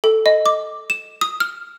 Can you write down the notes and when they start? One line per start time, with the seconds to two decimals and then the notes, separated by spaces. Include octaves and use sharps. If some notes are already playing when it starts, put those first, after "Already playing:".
0.04 A4
0.26 D#5
0.46 D6
0.90 E7
1.21 D#6
1.40 F6